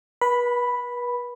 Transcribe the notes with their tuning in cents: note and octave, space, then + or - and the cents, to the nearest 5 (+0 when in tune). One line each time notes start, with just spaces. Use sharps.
B4 -35 B5 +0